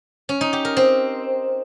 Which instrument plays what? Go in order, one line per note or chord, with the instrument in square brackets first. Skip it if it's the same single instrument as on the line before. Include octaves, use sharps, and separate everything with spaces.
[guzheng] C#4
D#4
G4
A#4
C4